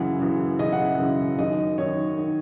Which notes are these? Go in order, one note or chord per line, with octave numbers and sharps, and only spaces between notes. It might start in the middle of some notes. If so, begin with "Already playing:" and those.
Already playing: F#2 C#3 E3 F#5
F#2 C#3 E3
F#2 C#3 E3 D#5
F#5
E5
F#2 C#3 E3
F#2 D#3 D#5
F#2 D#3 C#5
D#3